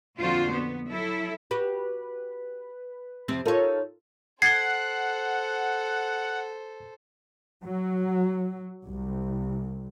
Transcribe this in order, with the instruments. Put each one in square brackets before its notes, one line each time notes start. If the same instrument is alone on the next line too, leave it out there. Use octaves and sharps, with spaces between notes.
[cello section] F2 A#2 D3 F4 F#4 C5
B3
F#3 E4 A4
[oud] F#4 G4 [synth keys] B4
[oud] F2 C3 C4
[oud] D#4 C#5 [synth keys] F4 A4 A#4
[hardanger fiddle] A4 C5 [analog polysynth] F#5 [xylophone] G#6 A6 G7 [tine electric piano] C7
[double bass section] F#3
C2